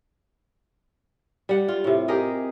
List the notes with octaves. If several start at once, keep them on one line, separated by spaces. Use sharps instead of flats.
G3 F#5
F4
A2 C3
G4 G#4 A#4 D#5